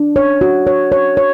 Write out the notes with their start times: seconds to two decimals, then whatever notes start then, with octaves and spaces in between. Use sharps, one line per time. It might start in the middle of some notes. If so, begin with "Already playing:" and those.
Already playing: D4
0.16 C#5
0.41 F#4
0.67 C#5
0.92 C#5
1.17 C#5